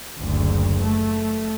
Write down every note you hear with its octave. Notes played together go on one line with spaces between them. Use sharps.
F#1 D2
A3